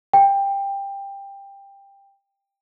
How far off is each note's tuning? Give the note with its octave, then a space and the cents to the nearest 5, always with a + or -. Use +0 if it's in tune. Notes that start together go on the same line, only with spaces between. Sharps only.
G5 +15